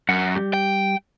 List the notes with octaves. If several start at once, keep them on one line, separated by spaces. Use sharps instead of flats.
F#2 F#5
G3 G4
G5